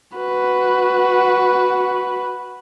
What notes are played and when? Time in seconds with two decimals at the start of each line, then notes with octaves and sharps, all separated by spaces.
0.18 F#4 B4